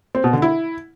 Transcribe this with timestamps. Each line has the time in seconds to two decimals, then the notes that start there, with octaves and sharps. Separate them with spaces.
0.15 C4
0.24 B2
0.33 D3
0.42 E4